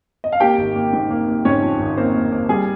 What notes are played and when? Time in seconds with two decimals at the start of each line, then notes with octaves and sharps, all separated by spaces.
0.24 D#5
0.32 F5
0.40 A#3 G4 G5
0.58 G#1
0.75 A#3
0.93 G#2
1.10 A#3
1.28 A#3
1.45 G#2 C#4 C#5
1.62 F3
1.80 G#1
1.97 A#3 C4 C5
2.14 A#3
2.32 A#3
2.49 G3 G#4